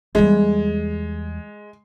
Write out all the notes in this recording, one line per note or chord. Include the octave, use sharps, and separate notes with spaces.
E2 G3 G#3